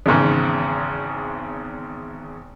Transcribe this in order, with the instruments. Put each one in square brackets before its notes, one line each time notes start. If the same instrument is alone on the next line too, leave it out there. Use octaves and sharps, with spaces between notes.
[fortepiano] G#1 E2 G#2 C#3